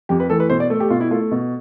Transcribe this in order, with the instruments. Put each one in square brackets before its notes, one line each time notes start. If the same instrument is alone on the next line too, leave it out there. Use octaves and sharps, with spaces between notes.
[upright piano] F2 G4
B4
E3 A3 A4
B4
B2 C5
D5
A3
G4
B2 F4
E4
A3 F4
B2